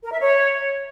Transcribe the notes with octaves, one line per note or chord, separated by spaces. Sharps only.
A#4
E5
C#5